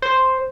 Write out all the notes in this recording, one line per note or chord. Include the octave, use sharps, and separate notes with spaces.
C5